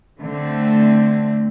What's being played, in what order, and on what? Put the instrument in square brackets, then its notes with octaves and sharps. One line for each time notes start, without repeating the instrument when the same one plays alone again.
[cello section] D3 A3 C4